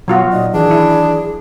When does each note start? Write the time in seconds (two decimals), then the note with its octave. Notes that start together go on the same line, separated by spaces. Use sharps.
0.08 B2 F#3 B3 F4 F#4
0.32 A#2 D#4 D5 D#5
0.54 D#3 E3 D4 G#4
0.71 E4